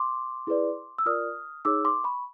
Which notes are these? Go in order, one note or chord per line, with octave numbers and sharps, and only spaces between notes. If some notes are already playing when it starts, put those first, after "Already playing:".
Already playing: C6 D6
E4 G#4 B4 D5
E6
F4 A#4 D5 D#6 F6
D#4 G#4 C#5 D6 E6
C6 D6
B5 C#6